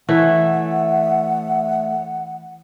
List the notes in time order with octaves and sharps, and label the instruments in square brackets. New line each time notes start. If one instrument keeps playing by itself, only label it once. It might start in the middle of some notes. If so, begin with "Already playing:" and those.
[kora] E3 [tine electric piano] A3 C#5 E5 [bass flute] F#5